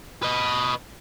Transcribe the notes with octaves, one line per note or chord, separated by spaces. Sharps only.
B4 D#5